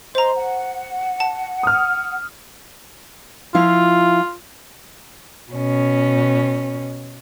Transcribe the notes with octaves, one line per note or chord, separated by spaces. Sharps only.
C5 D#5 A#5 C6
F#5
A5
D#6 F6
F3 E4 F4 F5
B2 C#4